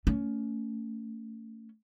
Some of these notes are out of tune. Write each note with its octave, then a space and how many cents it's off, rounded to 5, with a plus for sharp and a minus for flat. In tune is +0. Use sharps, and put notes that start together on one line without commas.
A3 +35 C#4 +25